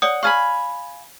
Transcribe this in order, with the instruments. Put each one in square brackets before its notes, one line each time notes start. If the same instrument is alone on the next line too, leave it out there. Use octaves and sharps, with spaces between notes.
[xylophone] C#5 D5 D#6 [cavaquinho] F#5
[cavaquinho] F5 G#5 B5 [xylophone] C#6 F6